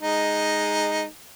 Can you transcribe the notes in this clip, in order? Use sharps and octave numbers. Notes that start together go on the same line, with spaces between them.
G#3 D#4